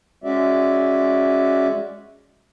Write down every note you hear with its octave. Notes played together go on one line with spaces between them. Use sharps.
G#3 C#4 F#4 D5 E5